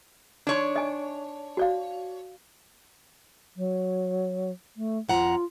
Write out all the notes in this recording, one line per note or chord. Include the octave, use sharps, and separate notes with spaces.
D4 D#4 C#5 C6
D#5 G#5
F#4 D5 F5
F#3
A3
F2 F4 F#5 A#5